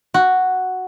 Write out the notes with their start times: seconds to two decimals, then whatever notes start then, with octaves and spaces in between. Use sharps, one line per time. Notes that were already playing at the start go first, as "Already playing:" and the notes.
0.14 F#4